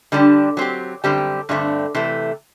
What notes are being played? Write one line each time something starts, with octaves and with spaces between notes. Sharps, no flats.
D3 G3 D4 G4
F#3 C4 G4
F#2 D3 G3 C4 G4
G2 D3 F#3 A3 C4
C3 E3 A3